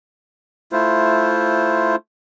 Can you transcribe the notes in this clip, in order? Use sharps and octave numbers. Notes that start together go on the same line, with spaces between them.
A3 E4 F4 C5